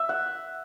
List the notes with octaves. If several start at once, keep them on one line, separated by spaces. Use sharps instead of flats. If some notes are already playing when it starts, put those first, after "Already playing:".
Already playing: E5
F#5